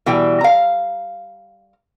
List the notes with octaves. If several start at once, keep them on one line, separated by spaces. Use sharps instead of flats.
B2 E3 G3 G5
F5 A#5